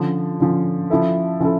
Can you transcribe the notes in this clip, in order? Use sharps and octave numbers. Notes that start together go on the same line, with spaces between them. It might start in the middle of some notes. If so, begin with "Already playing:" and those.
Already playing: D3 F3 C#4
D3 F3 C#4
F3 C#4 E4 A4
F3 C#4 E4 A4